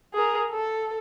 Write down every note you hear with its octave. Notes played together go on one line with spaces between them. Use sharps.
G#4 A#4
A4